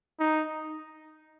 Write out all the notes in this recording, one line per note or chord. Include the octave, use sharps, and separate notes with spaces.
D#4